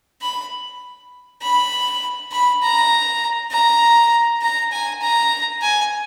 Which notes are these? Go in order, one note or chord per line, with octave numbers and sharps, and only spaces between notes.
B5
B5
B5
A#5
A#5
A#5
G#5
A#5
G#5